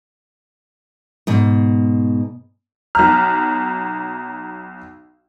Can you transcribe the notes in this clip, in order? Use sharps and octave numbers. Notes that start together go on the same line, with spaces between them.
G#2 B2
B1 A#5 F6